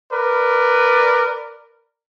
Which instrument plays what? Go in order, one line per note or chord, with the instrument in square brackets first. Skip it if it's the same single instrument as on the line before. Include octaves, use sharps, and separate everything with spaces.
[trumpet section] A#4 B4 D5